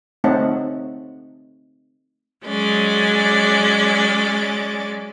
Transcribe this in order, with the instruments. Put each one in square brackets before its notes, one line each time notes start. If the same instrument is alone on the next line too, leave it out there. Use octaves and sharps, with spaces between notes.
[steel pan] A3 C4 D#4 C#5 F#5 A5
[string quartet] F#3 G#3 C#4 D5